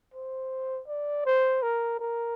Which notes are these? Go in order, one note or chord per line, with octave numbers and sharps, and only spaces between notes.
C5
D5
C5
A#4
A#4